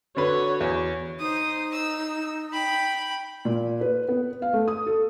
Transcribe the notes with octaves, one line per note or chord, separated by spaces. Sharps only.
D3 F#4 B4 C#5
E2
D#4 C5 D#6
E6
G5 B5
A#2
B4
B3
F5
A3
D#6
A4